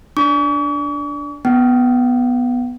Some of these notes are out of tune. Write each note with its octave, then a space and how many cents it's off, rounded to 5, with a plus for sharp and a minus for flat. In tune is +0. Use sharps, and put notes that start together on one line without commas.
D4 -5 C#6 +45
B3 +0 G5 -35